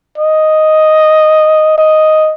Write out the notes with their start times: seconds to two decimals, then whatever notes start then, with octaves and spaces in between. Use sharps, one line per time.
0.18 D#5
1.78 D#5